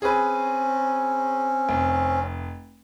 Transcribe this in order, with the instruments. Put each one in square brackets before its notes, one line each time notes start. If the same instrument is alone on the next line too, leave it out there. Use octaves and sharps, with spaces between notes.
[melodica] C4 C#4 [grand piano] G#4 B4
[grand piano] F1